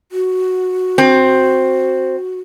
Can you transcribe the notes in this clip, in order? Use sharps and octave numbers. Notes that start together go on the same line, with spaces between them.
F#4
C4